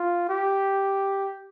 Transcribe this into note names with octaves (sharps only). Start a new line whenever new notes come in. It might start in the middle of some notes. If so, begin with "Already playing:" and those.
Already playing: F4
G4